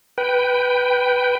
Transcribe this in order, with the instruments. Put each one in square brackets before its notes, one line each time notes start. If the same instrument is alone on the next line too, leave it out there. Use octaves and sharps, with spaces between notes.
[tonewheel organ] B4 G5